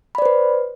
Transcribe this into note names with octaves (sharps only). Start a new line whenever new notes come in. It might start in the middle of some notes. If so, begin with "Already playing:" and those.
B4 C5 D5 B5